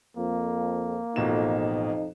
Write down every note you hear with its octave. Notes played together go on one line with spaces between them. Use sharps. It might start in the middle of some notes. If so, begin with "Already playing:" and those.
F2 A#3
A1 F2 B2 D#4 E7